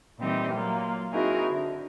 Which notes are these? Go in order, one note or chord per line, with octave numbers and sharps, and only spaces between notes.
A#2 E3 G3 C4 D#4 G4
F#3 A#3 F4
C4 D#4 E4 F#4 G#4 A#4
D3